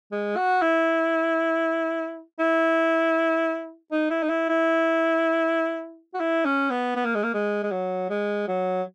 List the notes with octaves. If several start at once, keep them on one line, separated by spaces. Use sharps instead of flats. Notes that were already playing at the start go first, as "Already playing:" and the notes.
G#3
F#4
E4
E4
D#4
E4
D#4
E4
E4
F#4
E4
C#4
B3
B3
A#3
G#3
A#3
G#3
G#3
F#3
G#3
F#3